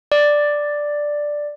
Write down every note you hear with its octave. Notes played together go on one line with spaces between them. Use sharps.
D5